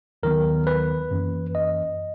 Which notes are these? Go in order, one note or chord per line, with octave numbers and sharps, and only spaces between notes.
D#2 D#3 F#3 B3 A#4
B4
F#2 E3 A#3 C#4
D#5